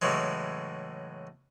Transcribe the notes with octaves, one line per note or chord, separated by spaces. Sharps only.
A2 C#3 E3 F#3 G#3